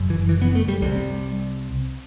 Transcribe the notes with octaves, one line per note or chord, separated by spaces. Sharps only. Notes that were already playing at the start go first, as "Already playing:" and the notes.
Already playing: F#1 F#2
E3
E3
B3
A3
G3
C2 C3 G3